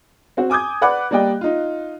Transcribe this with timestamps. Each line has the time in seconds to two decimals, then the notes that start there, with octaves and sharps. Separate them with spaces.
0.37 C4 F#4
0.50 G#5 D6 D#6 G6 G#6
0.81 B4 D5 F#5 B5 D6 F#6
1.11 G3 A#3 D5 D#5 G5
1.41 D#4 F4